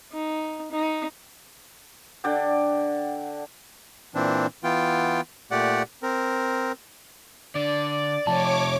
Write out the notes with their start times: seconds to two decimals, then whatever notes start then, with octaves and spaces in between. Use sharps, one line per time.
0.13 D#4
0.72 D#4
2.24 D3 D5 F#5 G5
4.15 A#2 E3 C4 D4
4.64 E3 B3 F4 G5
5.51 A#2 A3 G4 D5 F#5
6.03 C4 A#4
7.55 D3 D5
8.27 F2 C3 F3 C#5 A5 D6